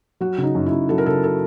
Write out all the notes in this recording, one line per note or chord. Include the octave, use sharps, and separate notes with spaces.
F#3 F#4
C#3
D#4
F#2
E4
F#2
F#3 A4
A#4
C#3 A4
A4